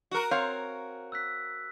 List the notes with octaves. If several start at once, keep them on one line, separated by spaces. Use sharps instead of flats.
F#4 A#4
C4 C#5 F5
E6 F#6 B6